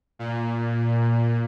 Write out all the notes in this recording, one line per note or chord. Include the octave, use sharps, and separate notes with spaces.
A#2